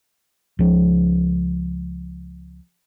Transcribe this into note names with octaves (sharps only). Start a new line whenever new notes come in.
C#2 F3